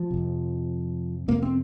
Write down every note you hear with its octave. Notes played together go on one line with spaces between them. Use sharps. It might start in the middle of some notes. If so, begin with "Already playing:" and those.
Already playing: F3
F2 C3
F2 C3 A#3
C4